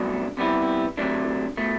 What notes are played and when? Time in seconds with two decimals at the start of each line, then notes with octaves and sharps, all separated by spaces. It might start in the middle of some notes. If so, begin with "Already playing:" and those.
Already playing: C2 B2 F#3 A3 D4
0.37 C3 G3 B3 E4
0.97 C3 F#3 A3 D4
1.57 B2 A3